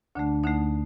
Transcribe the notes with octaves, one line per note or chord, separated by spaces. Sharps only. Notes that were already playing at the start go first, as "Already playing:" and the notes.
D2 D3 A3 D4
D2 D3 A3 D#4